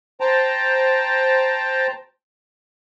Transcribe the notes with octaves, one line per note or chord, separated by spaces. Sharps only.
C5 G5 A5 A#5